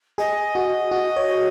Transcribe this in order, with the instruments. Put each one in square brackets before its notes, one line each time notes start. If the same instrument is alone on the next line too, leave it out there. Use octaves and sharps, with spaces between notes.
[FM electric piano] G#4 [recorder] D#5
[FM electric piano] F#4
F#4
C#5